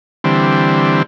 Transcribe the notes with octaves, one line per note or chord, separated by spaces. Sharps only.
D3 E3 G3 C4